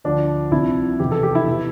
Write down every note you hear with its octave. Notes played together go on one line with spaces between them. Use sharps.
D2 D3 F3 D4
C2 C3 F3 E4
F1 E2 B2 G4
A4
G4
E4
B2